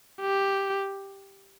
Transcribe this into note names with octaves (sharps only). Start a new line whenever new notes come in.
G4